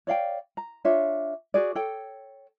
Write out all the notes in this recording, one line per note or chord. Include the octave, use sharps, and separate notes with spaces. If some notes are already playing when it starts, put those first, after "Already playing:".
C#5 D5 F5 G5
A#5
D4 F4 C#5 E5
F#4 G#4 D5
A4 C#5 G5